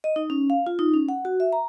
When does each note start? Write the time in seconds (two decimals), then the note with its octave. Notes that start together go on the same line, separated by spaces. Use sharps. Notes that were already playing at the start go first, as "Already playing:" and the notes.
0.04 D#5
0.16 D#4
0.30 C#4
0.50 F5
0.67 F4
0.79 D#4
0.94 C#4
1.09 F#5
1.25 F#4
1.40 E5
1.53 A#5